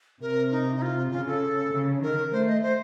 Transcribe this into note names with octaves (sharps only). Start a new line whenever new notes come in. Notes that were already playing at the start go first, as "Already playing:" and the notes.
C3 A#4
D#4
D#4
F4
C#3 F4
A4
C#3
D#3 A#4
A3 C5
D#5
C5